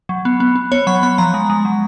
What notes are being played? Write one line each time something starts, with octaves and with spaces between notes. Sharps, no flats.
F#3
B3
B3
B3
B3 C#5
F#3 B5
B3 B5
F3 A#5
G#3
G#3
F#3